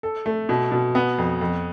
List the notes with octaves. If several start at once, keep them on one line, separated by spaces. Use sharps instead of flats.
A4
A3
B2
B2
B3
F2
F2